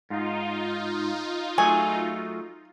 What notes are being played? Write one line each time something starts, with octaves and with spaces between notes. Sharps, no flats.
G#2 D#4 F4
F#3 A3 G#4 G#5